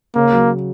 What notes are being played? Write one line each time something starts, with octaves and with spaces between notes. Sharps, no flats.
C#3 A#3
F#3